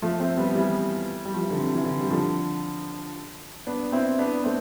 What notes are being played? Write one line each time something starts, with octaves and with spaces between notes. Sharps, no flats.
F3 A3
A3 C4
G3 B3
E3 G3
G3
F3
E3
D3
C3
E3
D3
G3
D3 F3
B3 D4
C4 E4
B3 D4
B3
A3 C4